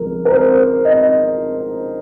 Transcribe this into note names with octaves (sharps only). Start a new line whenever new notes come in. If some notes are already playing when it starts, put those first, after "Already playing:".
Already playing: C#2 F3 G#3 A#4
A#4
C5
D#5